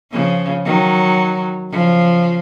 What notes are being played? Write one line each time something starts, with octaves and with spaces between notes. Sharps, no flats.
C#3 F3
D#3 F#3
C#3 F3